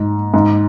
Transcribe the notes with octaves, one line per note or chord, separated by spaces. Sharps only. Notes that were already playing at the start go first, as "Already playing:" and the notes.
Already playing: G#2
G#2